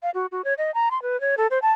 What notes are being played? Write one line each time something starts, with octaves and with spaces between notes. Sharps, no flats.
F5
F#4
F#4
C#5
D#5
A#5
C6
B4
C#5
A4
C5
A5